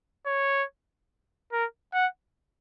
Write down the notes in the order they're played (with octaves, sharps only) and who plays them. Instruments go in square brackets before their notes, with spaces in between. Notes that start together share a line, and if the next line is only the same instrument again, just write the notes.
[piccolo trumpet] C#5
A#4
F#5